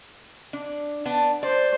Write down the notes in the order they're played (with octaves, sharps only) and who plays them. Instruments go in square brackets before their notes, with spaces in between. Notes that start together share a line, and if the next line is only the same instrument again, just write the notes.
[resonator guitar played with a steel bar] D4
B3 D4
[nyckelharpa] C5 [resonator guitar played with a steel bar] D5